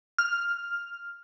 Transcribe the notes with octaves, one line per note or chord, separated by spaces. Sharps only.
F6